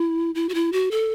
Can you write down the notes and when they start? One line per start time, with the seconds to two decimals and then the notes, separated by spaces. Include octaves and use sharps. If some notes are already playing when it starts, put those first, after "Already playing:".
Already playing: E4
0.35 E4
0.49 F#4
0.54 E4
0.72 F#4
0.91 A4